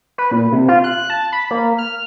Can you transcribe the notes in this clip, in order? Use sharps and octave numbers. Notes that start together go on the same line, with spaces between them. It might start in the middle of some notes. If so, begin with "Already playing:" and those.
B4
A#2
C3
F4
F#6
A5
B5
A#3
F6